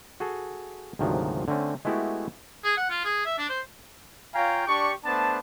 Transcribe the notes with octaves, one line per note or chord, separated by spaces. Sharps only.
F#4 G#4 A4
D2 G#2 C3 D#3 F3 F#3
D3 A3 C4 C#4
G#3 A3 B3 E4 F#4 G4
G#4
F#5
F4
G#4
E5
D4
C5
F4 C#5 F5 G5 G#5 A#5
D4 G4 D5 C#6
A3 B3 D4 C5 A5